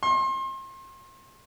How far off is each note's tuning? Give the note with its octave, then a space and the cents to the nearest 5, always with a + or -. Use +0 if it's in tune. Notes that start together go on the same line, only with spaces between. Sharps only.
C6 +35